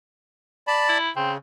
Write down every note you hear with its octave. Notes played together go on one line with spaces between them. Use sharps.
D5 A5 B5
E4
C#3 C4